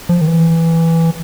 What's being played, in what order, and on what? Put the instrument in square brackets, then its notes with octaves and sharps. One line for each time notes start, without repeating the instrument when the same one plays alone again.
[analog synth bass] F3
D#3
E3